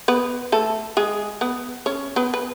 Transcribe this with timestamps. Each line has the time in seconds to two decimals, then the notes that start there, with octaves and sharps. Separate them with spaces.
0.08 B3 B4
0.52 A3 A4
0.97 G#3 G#4
1.41 B3 B4
1.86 C#4 C#5
2.16 B3 B4
2.34 B4